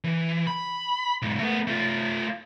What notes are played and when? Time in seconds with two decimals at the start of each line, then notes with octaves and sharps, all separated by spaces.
0.04 E3
0.47 B5
1.22 B1 G#2
1.39 A3 B3
1.67 A3 F4